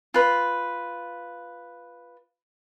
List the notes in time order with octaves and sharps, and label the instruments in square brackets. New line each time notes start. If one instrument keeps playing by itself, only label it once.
[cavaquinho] F4 B4